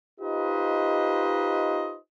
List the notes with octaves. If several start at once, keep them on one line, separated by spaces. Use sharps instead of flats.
D#4 F4 G4 B4 C5 D#5